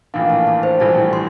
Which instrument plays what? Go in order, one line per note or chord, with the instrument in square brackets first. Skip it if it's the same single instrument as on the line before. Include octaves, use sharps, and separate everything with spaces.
[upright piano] A#1 A2 E3 A#3 D4 [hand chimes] F5
[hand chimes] A5
A5
C5
[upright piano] A#1 A2 E3 G3 [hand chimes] A5
[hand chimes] C6